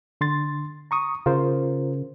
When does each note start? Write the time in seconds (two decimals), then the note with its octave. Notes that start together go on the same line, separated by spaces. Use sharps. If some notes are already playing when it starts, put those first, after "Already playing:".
0.21 D3 C6 A6
0.91 A#5 C#6 D#6
1.26 C#3 F4 A#4 C5